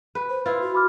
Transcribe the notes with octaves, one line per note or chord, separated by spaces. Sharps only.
B4
C5
E4 F4 B4
F#4
B5 D6 F6